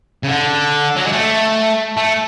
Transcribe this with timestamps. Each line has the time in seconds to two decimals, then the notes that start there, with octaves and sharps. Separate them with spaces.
0.23 C#3
0.28 D3
0.96 F#3
1.04 G#3
1.12 A3
1.97 A3